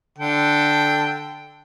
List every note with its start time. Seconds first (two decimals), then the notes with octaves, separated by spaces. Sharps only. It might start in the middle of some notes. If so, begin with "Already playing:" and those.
0.18 D3 A4 G5